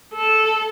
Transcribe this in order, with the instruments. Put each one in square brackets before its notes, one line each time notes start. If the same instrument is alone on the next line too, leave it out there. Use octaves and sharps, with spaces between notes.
[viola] A4